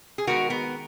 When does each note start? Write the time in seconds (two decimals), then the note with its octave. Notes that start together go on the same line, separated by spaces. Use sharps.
0.18 G#4
0.27 D#3 G#3 B3 F#4 A#4
0.50 B3